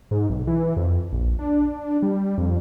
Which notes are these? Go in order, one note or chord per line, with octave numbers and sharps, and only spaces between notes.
G#2
B1
E3
F2
A#1
D4
G3
F2